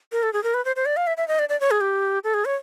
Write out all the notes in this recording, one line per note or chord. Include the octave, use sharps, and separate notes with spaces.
A#4
A4
G#4
A#4
B4
C5
C5
D5
F5
E5
E5
D#5
D5
D5
C#5
G#4
G4
A4
G#4
C#5